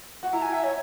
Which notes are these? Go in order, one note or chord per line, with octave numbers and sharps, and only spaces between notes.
F#4
E4 A#5
G#5
E5
C#5